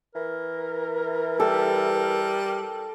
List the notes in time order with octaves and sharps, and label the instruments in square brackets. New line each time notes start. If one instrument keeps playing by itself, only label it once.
[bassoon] E3 [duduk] A#4
[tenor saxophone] G3 [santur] A4